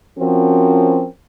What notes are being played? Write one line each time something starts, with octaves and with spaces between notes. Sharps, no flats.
F3 C4 C#4 F#4 A#4